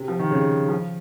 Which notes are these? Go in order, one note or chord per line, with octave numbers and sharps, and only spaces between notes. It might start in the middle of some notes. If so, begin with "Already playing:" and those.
Already playing: C3
F3
D#3
C#3
F3